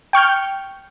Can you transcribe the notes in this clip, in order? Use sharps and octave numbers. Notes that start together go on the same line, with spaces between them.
G5 C#6 F6 G6